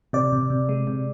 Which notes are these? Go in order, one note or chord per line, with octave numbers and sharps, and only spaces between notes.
C3 D5
C3
C3
G#3
C3